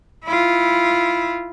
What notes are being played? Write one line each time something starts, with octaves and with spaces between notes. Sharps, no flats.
E4 F4